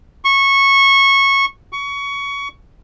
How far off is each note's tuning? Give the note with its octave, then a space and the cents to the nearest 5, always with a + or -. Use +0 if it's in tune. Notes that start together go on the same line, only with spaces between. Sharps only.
C#6 -15
C#6 +20